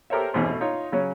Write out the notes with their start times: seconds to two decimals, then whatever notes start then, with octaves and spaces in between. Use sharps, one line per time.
0.10 G4 A4 A#4 C5 C#5 E5
0.33 A1 E2 G#2 B2 C4
0.47 B2 A3
0.61 D#4 F4 C#5
0.92 C#3 F#3 C#4